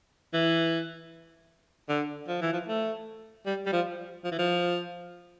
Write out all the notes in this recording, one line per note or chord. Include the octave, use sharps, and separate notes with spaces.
E3
D3
F3
E3
F3
A3
G3
G3
F3
F3
E3
F3